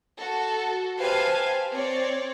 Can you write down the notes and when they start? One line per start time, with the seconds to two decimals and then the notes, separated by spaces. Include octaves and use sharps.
0.18 F#4 A4
0.98 G4 B4 C5 F5 G#5 A5
1.72 C4 C#5 D5